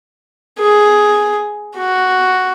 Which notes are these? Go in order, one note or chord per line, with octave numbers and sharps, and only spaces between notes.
G#4
F#4